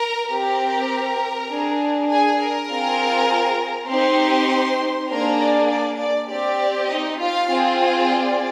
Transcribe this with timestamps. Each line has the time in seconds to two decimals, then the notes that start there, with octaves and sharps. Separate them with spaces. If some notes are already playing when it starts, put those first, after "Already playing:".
Already playing: A#4 A#5
0.30 C4 G4 A#4 A#5
1.50 D4 G#4
2.09 G#4 G#5
2.40 A#4 A#5
2.70 C4 F4 G#4
3.89 C4 D#4 G4 C5 C6
5.09 A#3 D4 G#4 A#4 A#5
5.40 D5
5.70 D5
6.00 D5
6.29 C4 G4 D5
6.89 D#4 D#5
7.19 F4 F5
7.50 C4 F4 G#4
8.09 D5